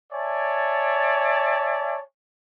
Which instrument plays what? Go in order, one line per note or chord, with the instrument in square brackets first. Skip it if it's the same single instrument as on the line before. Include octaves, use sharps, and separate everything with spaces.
[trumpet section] C#5 D5 E5 G#5 A5